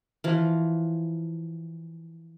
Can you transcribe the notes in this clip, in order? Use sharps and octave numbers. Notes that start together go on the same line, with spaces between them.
E3 F3